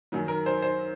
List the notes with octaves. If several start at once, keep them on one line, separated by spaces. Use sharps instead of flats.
F#2 D#3 F#3
A#4
C5
C5